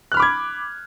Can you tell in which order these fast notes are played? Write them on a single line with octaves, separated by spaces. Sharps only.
F#6 F6 B5 D6 G#6